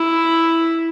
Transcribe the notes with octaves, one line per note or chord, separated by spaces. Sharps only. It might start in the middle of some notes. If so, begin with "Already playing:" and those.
Already playing: E4